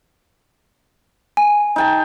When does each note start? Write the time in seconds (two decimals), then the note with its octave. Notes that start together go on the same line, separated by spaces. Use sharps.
1.37 G#5
1.76 D#4 G5 A5